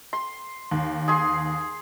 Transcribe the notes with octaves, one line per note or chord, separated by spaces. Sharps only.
C6
D#2
G#4 C6